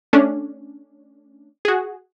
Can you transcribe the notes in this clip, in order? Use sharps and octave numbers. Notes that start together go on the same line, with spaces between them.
A3 C#4 D4
F#4 G#4